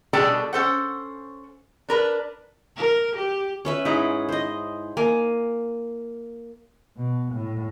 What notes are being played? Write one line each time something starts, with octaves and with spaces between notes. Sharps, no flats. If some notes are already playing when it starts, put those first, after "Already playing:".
B2 G3 D4 G#4 A4 G5
C#4 A4 C5 F#5
D4 A#4 B4
A#4
G4
C#4 B4 E5
G#2 D#4 E4 G#4
C5 D#5
A#3 G#5
B2
A2